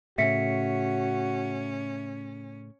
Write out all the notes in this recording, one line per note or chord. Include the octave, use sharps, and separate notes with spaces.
A2 C#3 C#4 F#4 E5 B6 C#7